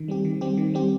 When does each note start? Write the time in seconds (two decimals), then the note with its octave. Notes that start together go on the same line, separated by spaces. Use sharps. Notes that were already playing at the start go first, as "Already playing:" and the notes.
Already playing: D#3
0.08 G3 C4 G4
0.25 D#3
0.41 G3 C4 G4
0.57 D#3
0.74 G3 C4 G4